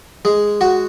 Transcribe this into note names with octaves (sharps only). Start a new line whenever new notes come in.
G#3
F#4